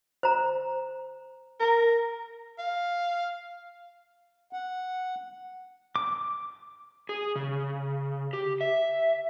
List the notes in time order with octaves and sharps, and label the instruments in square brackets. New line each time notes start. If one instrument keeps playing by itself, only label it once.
[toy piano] C5 A#5
[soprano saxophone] A#4
F5
[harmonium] F#5
[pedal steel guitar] D6
[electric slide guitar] G#4
C#3
G4
E5